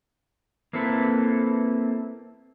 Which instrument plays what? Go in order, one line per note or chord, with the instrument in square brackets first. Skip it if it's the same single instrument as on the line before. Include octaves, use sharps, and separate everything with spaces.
[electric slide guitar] A#3 C4 E4 A4 B4